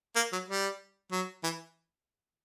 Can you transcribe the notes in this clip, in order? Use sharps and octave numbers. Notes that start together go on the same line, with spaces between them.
A#3
F#3
G3
F#3
E3